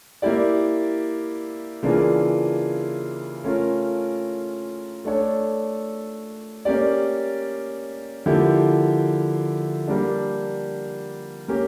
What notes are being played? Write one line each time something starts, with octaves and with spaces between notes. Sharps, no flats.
A#3 E4 G4 D5
C#3 E3 A#3 D4 F4
A3 C#4 F4 A#4
A3 D4 A4 C#5
A#3 C#4 G4 D5
D3 F3 A#3 E4 G4
G3 A#3 D4
A#3 C#4 G4